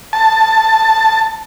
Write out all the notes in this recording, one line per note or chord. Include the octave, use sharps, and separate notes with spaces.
A5